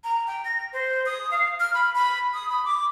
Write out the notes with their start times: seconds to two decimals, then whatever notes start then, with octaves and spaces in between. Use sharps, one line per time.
0.04 A#5
0.27 G5
0.45 A#6
0.73 C5
1.06 D#6
1.31 F5
1.60 F6
1.74 B5
1.95 B5
2.34 D#6
2.50 B5
2.65 D6